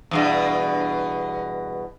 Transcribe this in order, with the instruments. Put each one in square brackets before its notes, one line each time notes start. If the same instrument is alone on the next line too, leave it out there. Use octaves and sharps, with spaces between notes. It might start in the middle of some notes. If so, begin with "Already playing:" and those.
[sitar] E2 G2 B2